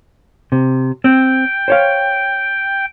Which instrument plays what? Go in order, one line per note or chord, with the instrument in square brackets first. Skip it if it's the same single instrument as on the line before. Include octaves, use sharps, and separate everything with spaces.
[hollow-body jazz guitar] C3
[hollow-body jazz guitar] C4 [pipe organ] G5
[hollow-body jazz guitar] C5 C#5 F5